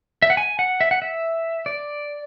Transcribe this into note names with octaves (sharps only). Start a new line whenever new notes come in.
E5
F#5
G#5
F#5
E5
F#5
E5
D5